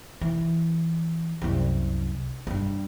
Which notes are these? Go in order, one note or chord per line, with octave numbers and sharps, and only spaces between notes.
E3
C2 F#2
G2 F4